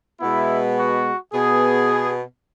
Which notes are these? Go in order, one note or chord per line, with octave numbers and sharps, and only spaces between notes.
B2 G#3 B3 E4
F#4
B2 B3 G#4